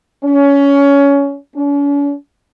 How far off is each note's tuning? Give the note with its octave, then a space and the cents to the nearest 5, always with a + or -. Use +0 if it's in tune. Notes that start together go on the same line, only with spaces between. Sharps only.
C#4 +20
C#4 +45